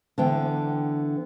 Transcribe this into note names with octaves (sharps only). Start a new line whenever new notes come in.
D3 E3 B3 G5